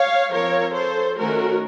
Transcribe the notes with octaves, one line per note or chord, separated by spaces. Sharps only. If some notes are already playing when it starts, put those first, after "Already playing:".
Already playing: C#5 F5
F3 C4 A#4 C#5
A4 C5
D#3 A3 C#4 F#4 A#4